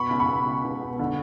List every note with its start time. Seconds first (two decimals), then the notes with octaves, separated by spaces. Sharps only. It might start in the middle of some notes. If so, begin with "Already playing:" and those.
Already playing: B2 B5 C#6
0.10 C#2
0.20 B5 C#6
0.29 B2
0.47 C#2
0.64 C#2
0.81 B2
0.99 D3